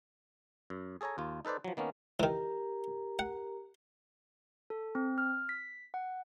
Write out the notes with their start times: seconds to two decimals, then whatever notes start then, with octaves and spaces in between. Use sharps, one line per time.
0.70 F#2
1.01 G#4 A4 C#5 G#5 A#5
1.18 D#2 F4
1.45 D#4 A4 B4 C5 D5
1.64 F3 F#3
1.77 D#3 A#3 B3 C#4
2.20 D#3 E3 G4 A#4 A#5
3.19 F#5
4.70 A4
4.95 C4
5.18 F6
5.49 B6
5.94 F#5